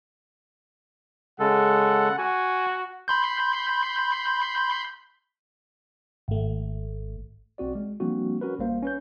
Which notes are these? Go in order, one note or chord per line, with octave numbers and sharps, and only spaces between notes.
C#3 G#3 A4 F#5
F#4 G#5
B5 C6 G6
G#1 A3
B1 C4 F#4 D5
G#3
F3 G3 A#3 C4 D4 F#4
C#4 F#4 A#4 B4
A1 G3 A#3 C5 F5
C#4 B4 G6